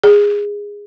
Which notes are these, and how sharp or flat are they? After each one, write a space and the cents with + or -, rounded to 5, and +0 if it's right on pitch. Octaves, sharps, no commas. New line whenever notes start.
G#4 -15